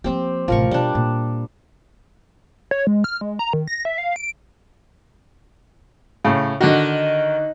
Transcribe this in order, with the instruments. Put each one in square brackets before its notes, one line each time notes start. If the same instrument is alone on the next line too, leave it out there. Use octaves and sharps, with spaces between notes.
[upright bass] F3 A#3 [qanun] C4 G4
[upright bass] A1 C3 [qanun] F3 A#4 C#6
[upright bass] B2 [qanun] G3 D4
[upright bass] A#2
[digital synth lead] C#5
G#3
F6
G#3
A#5
D#3
A#6
E5
F5
D7
[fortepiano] A2 C#3
[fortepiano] D3 F#4 [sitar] D#3